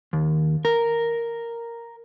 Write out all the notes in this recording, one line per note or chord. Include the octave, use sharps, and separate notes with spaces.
D#2
A#4